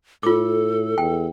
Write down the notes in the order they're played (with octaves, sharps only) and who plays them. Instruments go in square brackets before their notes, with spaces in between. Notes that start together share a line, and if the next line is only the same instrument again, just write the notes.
[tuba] A2 [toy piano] F4 D6 [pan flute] A4
[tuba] E2 [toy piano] G5